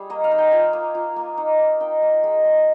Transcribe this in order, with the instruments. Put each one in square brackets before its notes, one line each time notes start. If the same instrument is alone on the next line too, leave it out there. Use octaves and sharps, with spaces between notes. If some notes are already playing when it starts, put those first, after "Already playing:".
Already playing: [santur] G3 G#4
A#3 D#5
F5
D#4
G5
F4 G#5
A#3
F4
A#3
D#4
A#3
D#4 G5
A#3
G#3
G#3